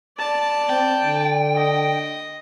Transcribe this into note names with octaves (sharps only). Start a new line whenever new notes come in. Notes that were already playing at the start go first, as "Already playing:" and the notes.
D5 A5
C4 G5
D3
D#5